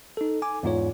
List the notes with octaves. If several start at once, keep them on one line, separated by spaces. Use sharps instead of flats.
D#4 A4
G#5 D6
E2 G#2 F4 C#5